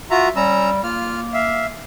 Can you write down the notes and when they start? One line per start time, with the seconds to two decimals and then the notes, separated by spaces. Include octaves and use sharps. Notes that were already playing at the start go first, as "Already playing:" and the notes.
0.11 F4 F#4 E5 A#5
0.36 G3 C#4 A#5 E6
0.83 A#3 F4 F6
1.34 E5 F5